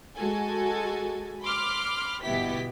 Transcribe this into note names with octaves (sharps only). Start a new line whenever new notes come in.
G#3 F#4 A4 G#5
B5 C6 D6 F6
G1 B2 B3 E4 G4 B6